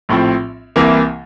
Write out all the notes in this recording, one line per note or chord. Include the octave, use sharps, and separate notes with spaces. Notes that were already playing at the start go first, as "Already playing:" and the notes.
A#1 A2 F3 C4
C2 C3 E3 A#3